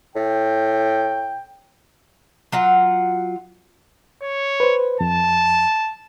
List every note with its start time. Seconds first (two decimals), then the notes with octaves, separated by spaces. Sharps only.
0.16 A2 G5
2.52 F#3 F4 F#5
4.22 C#5
4.60 B4 C5
5.00 F2 A5